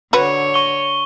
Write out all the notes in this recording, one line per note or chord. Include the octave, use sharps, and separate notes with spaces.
D3 F#4 B4 C#5
C#6 G7